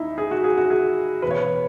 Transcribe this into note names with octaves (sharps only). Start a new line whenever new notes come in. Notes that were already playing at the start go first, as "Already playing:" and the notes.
Already playing: D#2 D#3 D#4 E4
G#4
F#4
G#4
F#4
G#4
E2 B4
B2 C#5
B4